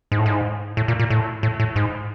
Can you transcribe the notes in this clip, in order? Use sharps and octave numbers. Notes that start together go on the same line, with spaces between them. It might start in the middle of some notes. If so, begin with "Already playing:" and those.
G#2
A2
G#2
A2
A#2
A#2
A2
A2
A2
G#2